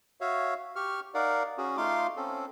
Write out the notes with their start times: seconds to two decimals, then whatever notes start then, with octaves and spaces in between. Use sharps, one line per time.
0.21 F#4 C#5 E5 F5
0.76 G4 C#6 F6
1.14 D#4 A#4 D5 F5 F#5
1.58 C#4 F#4 G#4
1.77 A3 D#4 F4 F5 C6 D6
2.16 C4 C#4 A4